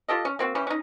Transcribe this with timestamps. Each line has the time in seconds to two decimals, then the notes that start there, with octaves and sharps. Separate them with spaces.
0.08 F4 G4 A4 D#5
0.25 C#4
0.39 A#3 C4 F#4
0.55 E3 C#4 G4
0.67 C#4 D#4